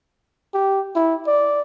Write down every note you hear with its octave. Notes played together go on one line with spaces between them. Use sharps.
G4
E4
D5